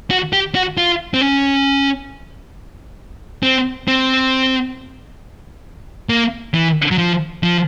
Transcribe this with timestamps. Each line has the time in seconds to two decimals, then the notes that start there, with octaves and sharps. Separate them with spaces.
0.11 F#4
0.33 G4
0.55 F#4
0.78 F4
1.14 C4
1.21 C#4
3.43 C4
3.88 C4
6.09 A#3
6.54 E3
6.91 F#3
6.98 F3
7.43 F3